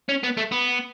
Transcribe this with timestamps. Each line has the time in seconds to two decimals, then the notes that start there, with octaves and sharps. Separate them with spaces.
0.09 C#4
0.23 B3
0.37 A3
0.52 B3